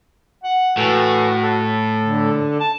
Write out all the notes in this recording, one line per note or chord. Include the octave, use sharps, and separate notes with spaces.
F#5
A2 E3 F#4 A4
A4
D3
A5